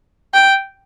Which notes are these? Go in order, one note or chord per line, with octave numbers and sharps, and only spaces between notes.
G5